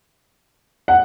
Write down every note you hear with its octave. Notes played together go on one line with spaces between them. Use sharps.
F#5